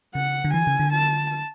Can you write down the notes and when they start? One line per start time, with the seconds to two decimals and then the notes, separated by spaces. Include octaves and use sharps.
0.15 C#3 F#5
0.44 D3
0.54 E3 G#5
0.67 C#3
0.80 D3
0.93 A5